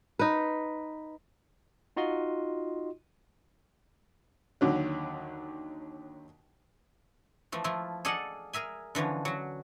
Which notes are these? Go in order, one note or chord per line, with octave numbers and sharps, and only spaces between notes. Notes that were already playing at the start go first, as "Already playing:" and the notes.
D#4 B4
D#4 F4 F#4 D#5 C6
D#2 D3 F#3
E3 F3 A3
F3 A3 E4 F4
G#4 A4 D5 D#5 F5 F#5
G#4 A#4 E5 G#5
D3 E3 F3 C#4
F#3 F#4